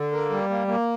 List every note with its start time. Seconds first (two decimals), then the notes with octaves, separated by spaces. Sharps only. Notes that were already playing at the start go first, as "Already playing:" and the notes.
Already playing: D3
0.12 A#3
0.30 G3
0.50 A#3
0.67 A#3